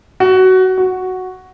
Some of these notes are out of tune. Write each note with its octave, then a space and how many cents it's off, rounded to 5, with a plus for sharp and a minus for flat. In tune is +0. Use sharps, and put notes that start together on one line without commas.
F#4 +15
F#4 +0